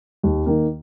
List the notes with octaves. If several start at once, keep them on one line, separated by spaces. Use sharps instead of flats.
D#2
D#3 A#3